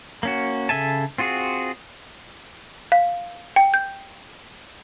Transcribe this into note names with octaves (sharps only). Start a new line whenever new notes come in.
A#3 C#4 F#4
C#3 A4 E5 G#5 A5
C4 F4 F#4 G#4
F5
G5
G6